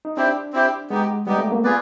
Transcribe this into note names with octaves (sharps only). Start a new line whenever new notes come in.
D#4
C4 D4 E4 G4 C5
C4 E4 G4 C5
G#3 B3 D#4 G4
G3 B3 D#4 G4
A3
A#3
B3 F4 G#4 B4 D5